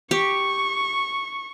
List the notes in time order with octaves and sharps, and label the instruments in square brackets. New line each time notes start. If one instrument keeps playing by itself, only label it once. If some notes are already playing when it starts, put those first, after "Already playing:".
[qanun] G4 [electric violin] C#6